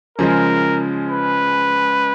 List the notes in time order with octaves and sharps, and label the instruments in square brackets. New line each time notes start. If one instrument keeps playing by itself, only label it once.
[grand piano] C#3 F3 G#3 [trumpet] A#4
[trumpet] B4